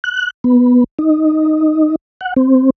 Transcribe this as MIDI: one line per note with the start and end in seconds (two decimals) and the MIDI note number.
0.04 0.30 90
0.44 0.84 59
0.99 1.95 63
2.21 2.34 78
2.36 2.70 60